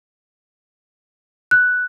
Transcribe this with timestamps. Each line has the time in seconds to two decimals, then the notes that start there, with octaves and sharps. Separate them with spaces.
1.51 F#6